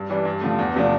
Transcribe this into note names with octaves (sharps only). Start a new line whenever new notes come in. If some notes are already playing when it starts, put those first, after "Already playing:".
Already playing: G2
E3 G3 D4
G2
D3 F3 A3
E2
C3 F3 A3 D4